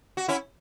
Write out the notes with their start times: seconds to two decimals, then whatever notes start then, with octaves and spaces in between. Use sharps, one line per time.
0.17 F#4
0.28 C#4 E4